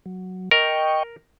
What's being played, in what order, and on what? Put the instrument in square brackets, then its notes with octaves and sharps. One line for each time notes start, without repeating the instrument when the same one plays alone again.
[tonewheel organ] F#3
[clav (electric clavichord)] A#4 [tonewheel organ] D#5 G5 C#6